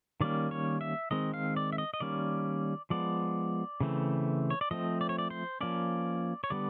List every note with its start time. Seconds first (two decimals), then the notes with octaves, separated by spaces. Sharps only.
0.21 D#3 G3 A#3 C#4 D5
0.51 C#5
0.81 E5
1.11 D#3 G#3 C4 D#5
1.34 F5
1.56 D5
1.72 E5
1.78 D#5
1.94 D#5
2.00 D#3 G3 A#3 C#4 D5
2.90 F3 G#3 B3 D5
3.81 C#3 E3 A3 C4
4.50 C#5
4.61 D5
4.71 F3 A3 C4 D#5
5.01 D5
5.09 C#5
5.19 D5
5.30 C5
5.61 F3 A#3 C#4 D5
6.44 C#5
6.50 D3 G3 B3 D5